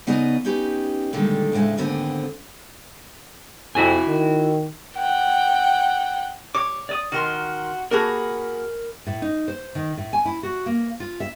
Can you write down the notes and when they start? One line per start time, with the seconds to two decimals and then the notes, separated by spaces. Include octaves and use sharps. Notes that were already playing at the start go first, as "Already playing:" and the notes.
0.07 C#3 B3 D#4 D5 D#5
0.45 C#4 D#4 G4 B4
1.13 A#2 D3 D#3 G3 G#3 A4
1.52 D2 A2 C#3 G#3 A3
1.77 D#2 G#2 D3 B3 C4
3.75 F2 E4 F#4 G#5
4.07 D#3
4.96 F#5 G5
6.55 C#5 D6
6.89 D5 D#6
7.12 D#3 F#4 A#4 C6
7.91 A#3 F#4 G#4 A#4 B5
9.06 A2
9.22 D#4
9.48 C5
9.75 D#3
9.97 A2
10.13 G#5
10.25 E4
10.43 F#4
10.66 A#3
11.00 F4
11.20 E5